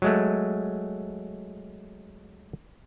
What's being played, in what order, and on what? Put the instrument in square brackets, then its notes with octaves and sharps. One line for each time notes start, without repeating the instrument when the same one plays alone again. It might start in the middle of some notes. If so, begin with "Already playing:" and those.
[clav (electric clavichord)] F#3 G#3 A3